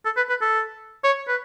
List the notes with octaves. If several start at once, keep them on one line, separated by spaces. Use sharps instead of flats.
A4
B4
B4
A4
C#5
B4